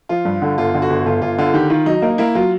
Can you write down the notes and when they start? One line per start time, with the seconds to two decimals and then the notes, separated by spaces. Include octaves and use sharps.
0.09 F3 F4
0.25 G2
0.42 D3
0.58 G1 F4
0.74 D3
0.82 F#4
0.90 G1
1.06 G1 F4
1.22 G1 F4
1.38 D3 F4
1.54 D#3 G4
1.70 D#3 F4
1.86 F#3 D#4
2.02 A#3 D#4
2.18 A#3 E4
2.35 F#3 F4